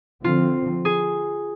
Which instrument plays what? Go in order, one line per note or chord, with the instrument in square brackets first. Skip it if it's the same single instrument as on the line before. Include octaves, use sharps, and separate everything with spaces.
[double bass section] D3 F3 C4 [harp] F4
[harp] G#4